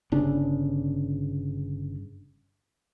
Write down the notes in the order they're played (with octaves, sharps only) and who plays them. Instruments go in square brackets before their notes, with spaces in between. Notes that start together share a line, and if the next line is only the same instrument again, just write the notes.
[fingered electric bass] G1 C#3 D4